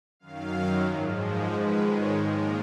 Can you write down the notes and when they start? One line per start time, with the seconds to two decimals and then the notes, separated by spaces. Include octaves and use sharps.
0.20 F#2 D#3 F#3 F5
0.87 G#2 F3 G#3
1.55 G#2 D#3 G#3 B4
1.89 C#5
2.23 A#2 F3 G#3 A#4